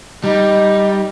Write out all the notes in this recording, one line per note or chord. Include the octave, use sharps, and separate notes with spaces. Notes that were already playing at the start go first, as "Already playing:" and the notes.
G3 D#4